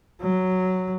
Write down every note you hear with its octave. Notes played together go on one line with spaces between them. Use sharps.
F#3